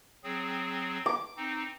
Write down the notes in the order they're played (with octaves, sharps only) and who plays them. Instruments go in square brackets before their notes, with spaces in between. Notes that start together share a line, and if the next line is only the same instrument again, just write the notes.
[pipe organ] F#3 C4 G#4
[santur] D6
[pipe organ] C4 D#4